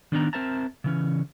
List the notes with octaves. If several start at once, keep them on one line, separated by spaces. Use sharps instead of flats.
D#3 B3 D4 D#4 D#5 A#5
C4 A#4 C5 E5 A5 A#5
C#3 E3 C#4